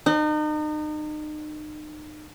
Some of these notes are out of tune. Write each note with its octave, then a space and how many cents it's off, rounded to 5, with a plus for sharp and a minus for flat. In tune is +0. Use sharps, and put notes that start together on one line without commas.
D#4 -35